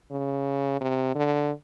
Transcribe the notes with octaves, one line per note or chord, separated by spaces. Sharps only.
C#3
C3
D3